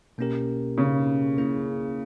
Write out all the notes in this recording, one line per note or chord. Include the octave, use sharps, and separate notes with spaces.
B2 A#3 C#4 G4 A#4
C#3
A#3 C#4 E4 G#4